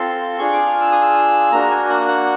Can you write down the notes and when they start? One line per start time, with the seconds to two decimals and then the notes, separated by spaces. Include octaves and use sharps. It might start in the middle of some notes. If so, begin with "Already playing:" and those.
Already playing: C4 F4 A4 C6
0.39 D4 F4 G#4 C#6
0.53 D6
0.67 F6
0.81 E6
0.92 D#6
1.02 E6
1.51 A#3 D4 F#4 A#5
1.70 G#5
1.89 F#5
2.08 F#5